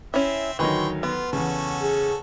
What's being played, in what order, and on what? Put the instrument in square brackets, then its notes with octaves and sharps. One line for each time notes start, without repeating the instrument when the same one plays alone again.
[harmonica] C4 E5 [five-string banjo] C#4 E4
[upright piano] D2 D#3 F#3 [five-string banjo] E3 [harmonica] G5 C6 C#6
[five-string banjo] B3 [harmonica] F4
[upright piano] E2 C#3 [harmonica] C#4 F#4 A4
[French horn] G#4